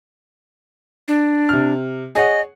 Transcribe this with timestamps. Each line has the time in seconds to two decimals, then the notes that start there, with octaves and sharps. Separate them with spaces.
1.08 D4
1.49 C3 F6
2.15 G#4 C#5 D#5 F#5